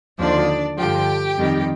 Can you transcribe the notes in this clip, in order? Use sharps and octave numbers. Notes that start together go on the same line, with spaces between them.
D#2 D3 F3 D4 D5
G2 D3 F3 G4 G5
F2 D#3 G3